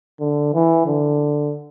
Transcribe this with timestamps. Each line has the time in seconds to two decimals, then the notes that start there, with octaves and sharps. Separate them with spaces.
0.20 D3
0.54 E3
0.86 D3